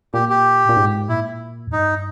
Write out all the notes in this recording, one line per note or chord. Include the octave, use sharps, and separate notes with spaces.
A#2 G4
G4
A#2
G#2
A#2 E4
E2
G2 D#4